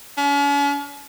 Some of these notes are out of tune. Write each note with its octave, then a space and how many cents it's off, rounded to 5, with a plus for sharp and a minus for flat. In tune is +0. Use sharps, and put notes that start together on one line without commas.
C#4 +45